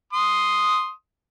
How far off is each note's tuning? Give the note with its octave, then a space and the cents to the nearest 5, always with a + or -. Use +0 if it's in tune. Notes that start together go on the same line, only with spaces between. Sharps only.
C6 +0 D#6 +0